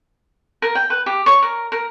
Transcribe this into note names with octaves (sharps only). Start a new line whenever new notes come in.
A#4
G5
B4
G4
C#5
A#4
A#4